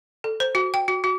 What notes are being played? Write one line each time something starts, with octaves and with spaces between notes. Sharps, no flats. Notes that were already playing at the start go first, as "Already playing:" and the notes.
A4
C5
F#4
G5
F#4
F#4